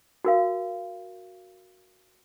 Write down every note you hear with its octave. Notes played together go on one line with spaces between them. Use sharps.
F#4 A#4 F5